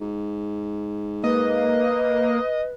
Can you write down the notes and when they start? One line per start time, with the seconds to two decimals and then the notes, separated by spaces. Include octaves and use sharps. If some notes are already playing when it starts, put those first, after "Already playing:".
0.01 G#2
1.24 A#3 B4 D#5